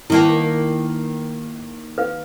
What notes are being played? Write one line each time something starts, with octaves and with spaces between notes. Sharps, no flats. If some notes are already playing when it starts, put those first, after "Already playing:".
D#3 A#3 B3 E4 A5
B4 F5